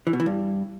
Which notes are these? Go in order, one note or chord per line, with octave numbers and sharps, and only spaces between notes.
E3
B2
E3
G2